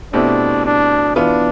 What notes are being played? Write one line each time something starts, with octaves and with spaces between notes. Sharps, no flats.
B2 A3 C4 D4 E4 G4
D4
E3 B3 D4 F4